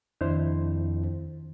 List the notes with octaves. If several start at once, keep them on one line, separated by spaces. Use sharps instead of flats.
F2 D#3 D4 E4 C5